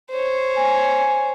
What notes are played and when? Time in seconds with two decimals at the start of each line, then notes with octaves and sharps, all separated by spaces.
0.11 C5 C#5
0.57 G#5